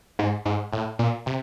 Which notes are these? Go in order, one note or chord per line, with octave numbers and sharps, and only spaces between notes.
G#2
G#2
A2
A#2
C3